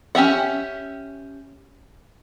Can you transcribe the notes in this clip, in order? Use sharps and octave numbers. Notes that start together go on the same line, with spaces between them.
C#4 G4 E5 F#5